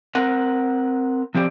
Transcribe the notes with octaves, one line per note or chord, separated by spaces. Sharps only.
C4 A#4 F#5
F3 C4 G4 D5